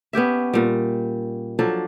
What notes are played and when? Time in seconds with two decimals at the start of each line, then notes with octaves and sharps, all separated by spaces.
0.13 B3 C#4 G4 E5
0.54 A#2 G3
1.59 F3 F#3 D4 A4